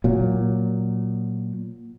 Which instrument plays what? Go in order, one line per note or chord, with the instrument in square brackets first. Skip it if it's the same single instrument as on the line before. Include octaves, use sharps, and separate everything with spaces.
[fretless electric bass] A#2 F#3